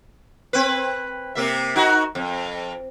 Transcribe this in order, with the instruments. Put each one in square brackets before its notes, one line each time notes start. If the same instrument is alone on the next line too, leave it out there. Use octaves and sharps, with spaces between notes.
[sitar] C4 B4
C3 A#3 E5
D#4 F#4
F2